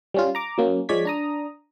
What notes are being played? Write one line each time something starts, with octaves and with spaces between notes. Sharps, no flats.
G3 C#4 F4
A#5 D6
F#3 A#3 C#4
F3 G#3 C#5 D5 G#6 B6
D4 A#5 D#6